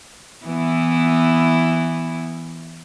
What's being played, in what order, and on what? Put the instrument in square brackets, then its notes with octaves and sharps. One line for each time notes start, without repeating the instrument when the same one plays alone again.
[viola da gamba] E3 B3 E4